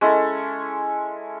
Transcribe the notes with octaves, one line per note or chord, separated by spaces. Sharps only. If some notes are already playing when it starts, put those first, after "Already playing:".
G#3 C#4 E4 A4